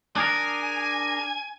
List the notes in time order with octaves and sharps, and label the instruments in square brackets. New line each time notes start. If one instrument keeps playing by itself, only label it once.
[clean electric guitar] D4 G#4 A#4 [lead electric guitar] G#5